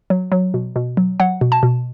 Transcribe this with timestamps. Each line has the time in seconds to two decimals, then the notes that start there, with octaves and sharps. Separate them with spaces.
0.10 F#3
0.32 F#3
0.54 B2
0.76 B2
0.97 F#3
1.20 F#3 F#5
1.41 B2
1.52 A5
1.63 B2